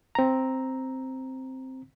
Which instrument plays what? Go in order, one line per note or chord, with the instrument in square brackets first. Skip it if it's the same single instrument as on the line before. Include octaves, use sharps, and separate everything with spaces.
[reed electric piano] C4 A#5